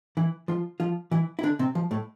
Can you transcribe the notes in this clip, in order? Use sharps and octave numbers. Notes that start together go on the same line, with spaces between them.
E3 E4
F3 F4
F3 F4
E3 E4
E4
D3 D4
C3 C4
F3
A2 A3